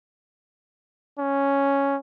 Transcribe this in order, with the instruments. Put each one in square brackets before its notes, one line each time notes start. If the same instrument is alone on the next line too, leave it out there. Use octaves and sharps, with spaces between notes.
[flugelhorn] C#4